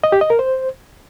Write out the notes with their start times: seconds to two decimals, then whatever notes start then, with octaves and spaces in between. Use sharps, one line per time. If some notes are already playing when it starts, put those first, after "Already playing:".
0.04 D#5
0.12 G4
0.21 D#5
0.30 A#4
0.39 C5